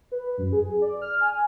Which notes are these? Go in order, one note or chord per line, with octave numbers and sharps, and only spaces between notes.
B4
F#2
G#4
D5
F6
G#5